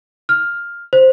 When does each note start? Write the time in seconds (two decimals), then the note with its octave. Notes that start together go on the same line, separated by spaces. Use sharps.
0.29 F6
0.93 C5